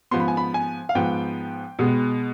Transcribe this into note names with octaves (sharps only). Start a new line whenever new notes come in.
G#2 F3 B3 C6
B5
G#5
B5
G#5
F5
G#2 F3 B3 G5
B2 G#3 B3